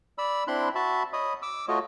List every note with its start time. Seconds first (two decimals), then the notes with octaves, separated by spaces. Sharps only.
0.18 D5 B5 E6
0.48 C4 D4 E4 B5 C6 F#6
0.75 F#4 E5 A5 B5
1.13 C#5 D#5 B5 D#6
1.42 D6 E6
1.68 A3 F4 F#4 C#5 D#5